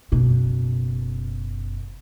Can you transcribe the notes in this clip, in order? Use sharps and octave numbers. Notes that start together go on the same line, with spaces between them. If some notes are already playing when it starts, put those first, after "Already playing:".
F#1 B2